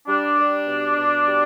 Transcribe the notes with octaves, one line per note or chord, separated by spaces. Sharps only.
G3 D4
G3
B2
B2
G3